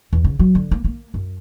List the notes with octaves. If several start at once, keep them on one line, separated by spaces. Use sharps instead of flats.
E2
C#3
F#3
D3
A#3
A#3
F#2